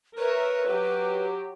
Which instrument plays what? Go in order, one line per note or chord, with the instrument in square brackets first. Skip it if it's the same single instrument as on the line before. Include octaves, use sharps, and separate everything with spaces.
[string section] A#4 C#5 E5 [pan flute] B4
[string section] F#3 G4